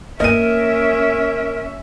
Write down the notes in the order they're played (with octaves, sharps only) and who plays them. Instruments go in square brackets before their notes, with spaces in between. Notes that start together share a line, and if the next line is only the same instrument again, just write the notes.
[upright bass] A#3 [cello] C#4 E5 [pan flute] A#4 [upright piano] D#5 D#7